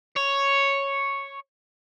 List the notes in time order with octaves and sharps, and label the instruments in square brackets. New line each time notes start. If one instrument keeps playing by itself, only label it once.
[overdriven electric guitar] C#5